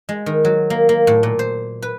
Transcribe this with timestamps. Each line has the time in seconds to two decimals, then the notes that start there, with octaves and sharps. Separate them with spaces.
0.09 G#3
0.26 D#3
0.45 F#3
0.70 A#3
0.89 A#3
1.07 A2
1.23 A#2
1.39 C5
1.82 B4